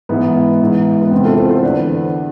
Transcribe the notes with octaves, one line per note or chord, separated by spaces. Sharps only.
G#2 E3 B3
G#2 E3
B3
E2 C3 E3 C4
F4 A4
A4 C5
A4 C5
E2 D3 B4 D5